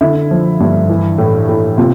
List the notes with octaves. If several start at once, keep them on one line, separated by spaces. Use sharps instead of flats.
D3 E4
F3
G2
E3
A2
A2
C3 F4